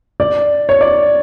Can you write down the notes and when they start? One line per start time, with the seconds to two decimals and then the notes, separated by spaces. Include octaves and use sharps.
0.20 D5
0.69 C#5
0.81 D5